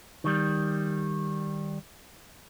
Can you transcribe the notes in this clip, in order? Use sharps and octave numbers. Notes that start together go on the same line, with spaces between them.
D#3 G3